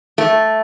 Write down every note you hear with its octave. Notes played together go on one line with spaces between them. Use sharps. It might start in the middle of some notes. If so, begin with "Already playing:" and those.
A3